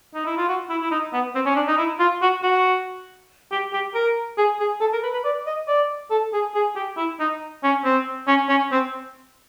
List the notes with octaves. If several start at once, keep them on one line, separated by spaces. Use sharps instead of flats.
D#4
E4
F4
F#4
E4
E4
D#4
B3
C4
C#4
D4
D#4
E4
F4
F#4
F#4
G4
G4
A#4
G#4
G#4
A4
A#4
B4
B4
D5
D#5
D5
A4
G#4
G#4
G4
E4
D#4
C#4
C4
C#4
C#4
C4